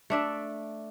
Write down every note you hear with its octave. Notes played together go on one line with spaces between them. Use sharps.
A3 D4 E5